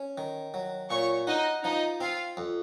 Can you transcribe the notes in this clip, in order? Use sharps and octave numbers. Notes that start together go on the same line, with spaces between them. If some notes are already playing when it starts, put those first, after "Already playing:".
Already playing: C#4
D#3
F#3
A#2 C#5 C#6
D#4 F#4 D#5
F3 D#4 D#5
C4 F4 F5
F2